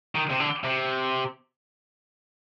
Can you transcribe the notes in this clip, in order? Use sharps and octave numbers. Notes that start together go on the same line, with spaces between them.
D#3
C3
D3
C3